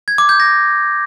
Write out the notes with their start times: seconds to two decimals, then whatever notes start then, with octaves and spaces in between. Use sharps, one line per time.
0.08 G#6
0.18 D6
0.29 G6
0.40 A#6